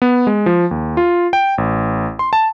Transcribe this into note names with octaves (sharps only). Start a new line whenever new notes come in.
B3
G#3
F3
D#2
F4
G5
A1
C6
A5